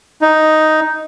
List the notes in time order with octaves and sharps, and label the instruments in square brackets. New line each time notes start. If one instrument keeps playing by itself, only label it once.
[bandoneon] D#4